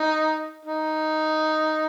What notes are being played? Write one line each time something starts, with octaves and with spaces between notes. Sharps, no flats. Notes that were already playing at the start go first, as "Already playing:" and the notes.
Already playing: D#4
D#4